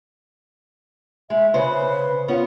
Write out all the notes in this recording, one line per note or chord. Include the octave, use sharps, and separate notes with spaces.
G#3 E5
C#3 B4 C5
B3 C#4 F4